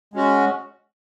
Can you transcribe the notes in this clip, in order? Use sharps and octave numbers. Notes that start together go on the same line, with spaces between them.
G#3 C#4 F#4